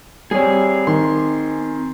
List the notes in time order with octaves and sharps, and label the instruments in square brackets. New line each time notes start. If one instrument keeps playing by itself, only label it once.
[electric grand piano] G3 C#5 [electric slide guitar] C4 G#4
[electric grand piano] D#3 C6